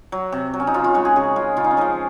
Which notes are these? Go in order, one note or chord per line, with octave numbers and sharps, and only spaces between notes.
F#3
C3
F#3
C#4
D#4
C#3 F4
F4
G#3 F#4
G#4
C#3 G#4
G#3 F4
C#3 F4
D#4
C#4
F3 G#3 D#4